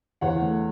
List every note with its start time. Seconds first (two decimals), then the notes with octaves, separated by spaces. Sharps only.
0.21 E2 C#5 F#5
0.42 A3